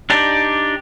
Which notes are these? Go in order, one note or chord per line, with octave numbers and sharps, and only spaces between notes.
D4 D#4 G4 D5